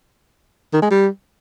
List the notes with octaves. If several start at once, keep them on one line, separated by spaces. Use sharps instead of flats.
D#3
G#3
G3